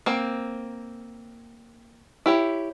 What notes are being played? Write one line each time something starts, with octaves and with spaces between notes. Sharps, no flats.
A#3 C4
E4 G4 C#5